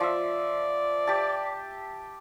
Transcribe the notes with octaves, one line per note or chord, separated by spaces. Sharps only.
F3 D5 E5
G4 A5